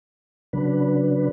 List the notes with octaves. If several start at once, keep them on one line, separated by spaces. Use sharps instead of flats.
C#3 F#3 D4 B4